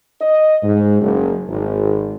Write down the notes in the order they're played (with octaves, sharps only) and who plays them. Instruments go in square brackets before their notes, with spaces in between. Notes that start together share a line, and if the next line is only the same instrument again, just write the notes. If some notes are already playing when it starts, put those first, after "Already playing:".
[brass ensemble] D#5
G#2
F#1
G#1